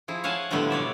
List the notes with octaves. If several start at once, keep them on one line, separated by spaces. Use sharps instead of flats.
F3 E4 G#4
C#5 F5 F#5 G#5 A5
A2 D3 F3 G3 A3 B3
B2 C#5 D5 E5